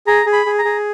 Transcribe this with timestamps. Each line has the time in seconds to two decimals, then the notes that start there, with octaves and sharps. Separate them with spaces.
0.07 G#4 A#5
0.26 G#4
0.33 B5
0.46 G#4
0.59 A#5
0.65 G#4